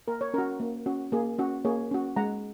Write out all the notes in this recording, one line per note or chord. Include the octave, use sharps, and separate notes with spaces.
A#3 A#4
C#5
C#4 F#4 A#4
A#3
C#4 F#4
A#3 G#4
C#4 F#4
A#3 G#4 C#5
C#4 F#4
G#3 F#5 A#5